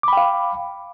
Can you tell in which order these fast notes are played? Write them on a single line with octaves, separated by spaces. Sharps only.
D6 B5 G5 F5